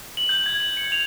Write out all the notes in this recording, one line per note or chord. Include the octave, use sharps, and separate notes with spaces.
F#7
G6
G#6
F#7
C#7
F7